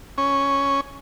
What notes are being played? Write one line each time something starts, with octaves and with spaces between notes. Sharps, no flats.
C#4